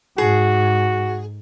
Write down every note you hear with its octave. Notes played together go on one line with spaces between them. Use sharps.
G#2 F#4 G#4